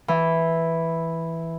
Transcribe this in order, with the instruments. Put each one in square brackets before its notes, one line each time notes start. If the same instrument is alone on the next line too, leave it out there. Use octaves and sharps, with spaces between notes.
[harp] E3